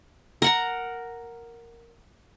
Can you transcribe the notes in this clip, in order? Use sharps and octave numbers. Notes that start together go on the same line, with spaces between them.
A#4 F#5 A#5